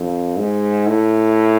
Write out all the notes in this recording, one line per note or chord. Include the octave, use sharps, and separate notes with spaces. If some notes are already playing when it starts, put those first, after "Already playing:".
Already playing: F2
G#2
A2